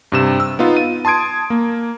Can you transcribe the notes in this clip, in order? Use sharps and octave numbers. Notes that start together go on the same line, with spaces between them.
G2 C3 E7
E6
B3 D#4 F4
D#7
A5 C6 D#6 G#6 D7
A#3